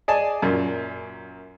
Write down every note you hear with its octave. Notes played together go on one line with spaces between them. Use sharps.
G#4 D5 D#5 G#5 A5
F#2 A#2